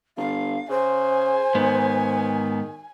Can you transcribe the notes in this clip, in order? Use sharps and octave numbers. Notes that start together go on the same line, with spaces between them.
G1 F5
C#3 C5 G#5
G#2 D#3 B3